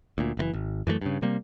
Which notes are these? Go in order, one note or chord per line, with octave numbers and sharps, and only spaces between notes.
D2 A#2
F#1 A#2 E3
G#1
F#2 E3 F3 A3
G2 C#3
C3 G3 A#3